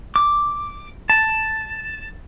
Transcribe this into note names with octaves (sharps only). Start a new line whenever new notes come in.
D6
A5